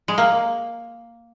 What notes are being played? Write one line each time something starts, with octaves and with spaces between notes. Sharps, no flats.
G#3
A#3